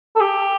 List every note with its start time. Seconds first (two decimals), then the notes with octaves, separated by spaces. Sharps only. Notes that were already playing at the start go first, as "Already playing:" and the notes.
0.16 A4
0.21 G4